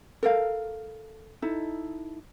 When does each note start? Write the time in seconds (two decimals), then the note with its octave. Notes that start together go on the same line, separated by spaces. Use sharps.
0.23 A4 A#4 F5
1.42 D#4 E4 A4